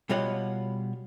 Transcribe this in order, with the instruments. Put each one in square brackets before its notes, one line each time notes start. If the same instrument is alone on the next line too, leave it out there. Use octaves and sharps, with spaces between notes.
[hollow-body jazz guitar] B2 G3 F4 C#5 D#5 F#5